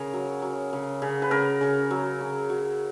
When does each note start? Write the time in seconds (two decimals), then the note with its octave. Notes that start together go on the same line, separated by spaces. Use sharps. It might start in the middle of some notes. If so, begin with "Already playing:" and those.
Already playing: C#3 G#4 A#4
0.14 F#3
0.42 F#3
0.73 C#3
1.02 C#3
1.22 B4
1.31 C#3 A#4
1.61 C#3
1.91 F#3
2.21 C#3
2.50 F#3